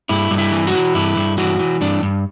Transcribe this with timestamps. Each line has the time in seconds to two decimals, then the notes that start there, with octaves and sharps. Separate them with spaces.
0.09 G2 E4
0.31 G2
0.38 E4
0.52 E3
0.67 F#4
0.74 E3
0.95 G2 E4
1.17 G2
1.38 E3 F#4
1.59 E3
1.81 G2 D4
2.02 G2